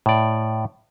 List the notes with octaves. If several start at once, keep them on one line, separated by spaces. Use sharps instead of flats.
A2 D5